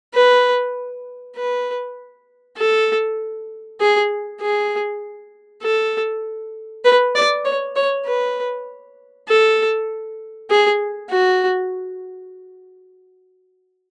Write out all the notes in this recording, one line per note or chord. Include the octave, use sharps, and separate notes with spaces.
B4
B4
A4
G#4
G#4
A4
B4
D5
C#5
C#5
B4
A4
G#4
F#4